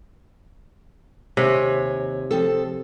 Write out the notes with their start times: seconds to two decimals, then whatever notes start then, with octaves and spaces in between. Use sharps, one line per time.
1.37 D#2 C3 C#5 G#5
2.31 F3 C4 A4